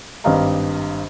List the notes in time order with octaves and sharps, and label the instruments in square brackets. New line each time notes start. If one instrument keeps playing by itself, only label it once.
[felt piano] G#1 G2 G4 D#5 F5 A#5